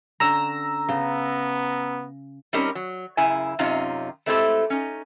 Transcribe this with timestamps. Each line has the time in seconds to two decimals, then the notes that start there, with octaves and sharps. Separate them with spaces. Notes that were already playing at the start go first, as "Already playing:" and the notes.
0.20 D3 C#4 A#5 E6 A#6
0.89 C#3 B3
2.53 G3 C4 C#4 D#4 G4 A#4
2.75 F#3
3.17 F#2 C#3 E4 G#5
3.59 F#2 C3 C#4 D#4 F4
4.26 G#3 A3 C4 E4 G4 A4
4.70 C#4 D#4